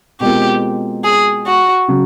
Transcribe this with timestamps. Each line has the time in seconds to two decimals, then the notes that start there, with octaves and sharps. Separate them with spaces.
0.20 B2 G#3 C4 F4 G4 A#4
1.04 G#4
1.47 F#4
1.88 C#3 F#3